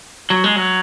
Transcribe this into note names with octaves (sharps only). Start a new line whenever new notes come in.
F#3
G#3
F#3